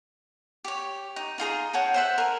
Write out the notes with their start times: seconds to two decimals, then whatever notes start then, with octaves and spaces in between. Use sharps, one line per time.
0.64 G4 C#5
1.16 D#4
1.38 D#4 F4 G#4 A#5
1.73 C#5 F#5 G5 A5
1.94 C5 E5 F#5
2.18 A#4 G#5